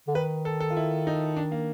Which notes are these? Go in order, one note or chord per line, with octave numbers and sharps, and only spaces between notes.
D3
D#3 B4
A4
A4
F4
E4
D#4
D4
A#3